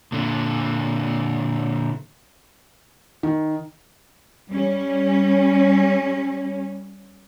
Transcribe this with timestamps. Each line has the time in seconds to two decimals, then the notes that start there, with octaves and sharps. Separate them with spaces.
0.12 A#2 D3
3.23 D#3
4.50 G3 C#4